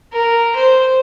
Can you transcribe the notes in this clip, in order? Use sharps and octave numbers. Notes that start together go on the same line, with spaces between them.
A#4
C5